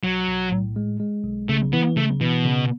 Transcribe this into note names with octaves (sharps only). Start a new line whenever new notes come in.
B1 F#3
B1
A2
G#3
G#3
B1
C#3 A3
E3 B3
C#3 A3
B2 E3
C#3